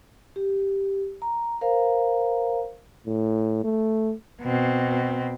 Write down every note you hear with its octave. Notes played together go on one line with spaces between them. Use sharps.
G4
A#5
A#4 C5 F5 A#5
A2
A3
B2 C4